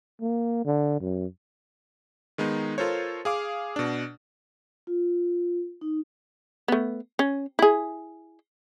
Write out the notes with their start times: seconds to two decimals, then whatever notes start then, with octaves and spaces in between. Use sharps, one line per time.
0.22 A#3
0.65 D3
1.00 F#2
2.38 D#3 G#3 B3 D#4
2.78 F4 A4 A#4 C5 C#5
3.25 G#4 F5 D6
3.76 B2 D4
4.87 F4
5.81 D#4
6.68 A3 B3
7.19 C#4
7.59 E4 G#4